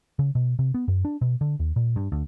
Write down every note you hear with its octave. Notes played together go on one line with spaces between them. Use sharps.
C#3
B2
C3
B3
F#2
D4
B2
D3
D#2
A#2
G2
D2